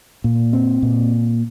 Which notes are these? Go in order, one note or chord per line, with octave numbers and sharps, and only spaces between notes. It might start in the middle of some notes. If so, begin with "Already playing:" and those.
A#2
C4
A#2